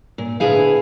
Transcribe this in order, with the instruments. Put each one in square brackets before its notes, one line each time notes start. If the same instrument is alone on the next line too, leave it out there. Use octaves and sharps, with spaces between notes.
[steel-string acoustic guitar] A#2
D2 B3 E4 G#4 F5